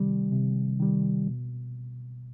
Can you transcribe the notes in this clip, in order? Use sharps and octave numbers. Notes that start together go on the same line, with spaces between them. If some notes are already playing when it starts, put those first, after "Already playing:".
Already playing: C3 D#3 G3
C3
D#3 G3
B2